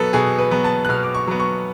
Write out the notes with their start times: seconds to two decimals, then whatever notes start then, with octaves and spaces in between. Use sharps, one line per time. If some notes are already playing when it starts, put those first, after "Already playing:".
Already playing: B2 F#3 B3 A4
0.13 B2 G#4
0.39 B4
0.51 F#3 B3
0.64 A5
0.85 F#6
0.89 B2 F6
1.03 D6
1.14 C#6
1.27 F#3 B3
1.40 C#6